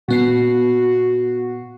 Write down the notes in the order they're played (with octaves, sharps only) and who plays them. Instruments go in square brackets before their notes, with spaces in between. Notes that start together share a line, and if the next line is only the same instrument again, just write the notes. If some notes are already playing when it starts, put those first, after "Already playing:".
[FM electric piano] A#2 B3 C7 [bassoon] F#4